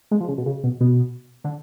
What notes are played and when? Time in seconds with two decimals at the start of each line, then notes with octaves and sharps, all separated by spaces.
0.11 G#3
0.20 F3
0.28 C#3
0.38 B2
0.46 C#3
0.64 B2
0.81 B2
1.44 D3